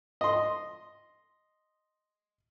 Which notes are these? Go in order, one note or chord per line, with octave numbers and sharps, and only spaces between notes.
D#5 C6